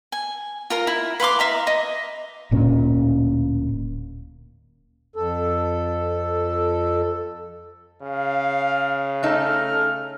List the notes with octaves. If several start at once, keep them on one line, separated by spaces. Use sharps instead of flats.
G#5
F4 A#4 A#5
E4
B4 F5 C6 D6
E5 F5 A#5
D#5
D1 A#2 C#4
F2 A4
C#3 F5
A3 D#4 A4 F6